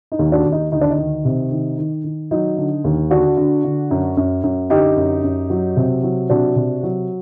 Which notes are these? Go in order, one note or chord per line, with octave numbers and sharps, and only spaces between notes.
D#4
D#2
D4 F#4
D#2
D#4
D2 D#4
D4
D#4
D#3
C3
D#3
D#3
D#3
F#3 D#4
D3
D#2
D3 D4 F#4
D3
D3
F#2
F#2
F#2
D3 D#4 G4
F#2
F#2
F#3
C3
F#3
C3 D4 F#4
C3
F#3